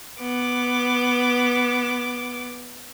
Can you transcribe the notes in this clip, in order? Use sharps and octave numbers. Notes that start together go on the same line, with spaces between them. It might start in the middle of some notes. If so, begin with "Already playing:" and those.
B3 D6